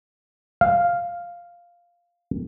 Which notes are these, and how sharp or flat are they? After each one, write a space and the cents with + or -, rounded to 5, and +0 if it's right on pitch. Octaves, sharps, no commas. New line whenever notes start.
F5 +0